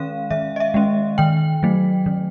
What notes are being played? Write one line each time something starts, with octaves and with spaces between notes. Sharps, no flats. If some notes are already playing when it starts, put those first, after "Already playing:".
Already playing: D#3 G#3 C#4 F5
D#3 E5
D#5
E5
G#3 C#4
D#3 G5
F#3 A3
D#3